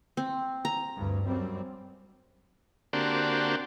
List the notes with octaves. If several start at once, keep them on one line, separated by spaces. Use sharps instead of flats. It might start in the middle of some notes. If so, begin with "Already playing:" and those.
C4
A#5
D2 G2
F#2 G3 C4
D3 A#3 C4 D4 F#4 G4